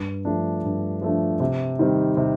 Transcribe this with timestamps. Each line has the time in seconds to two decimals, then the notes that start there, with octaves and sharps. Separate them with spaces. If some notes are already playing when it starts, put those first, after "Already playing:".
Already playing: G2
0.25 F3 A3 D4
0.64 G2
1.02 F3 A3 D4
1.40 C3
1.79 D#3 G3 C4
2.17 C3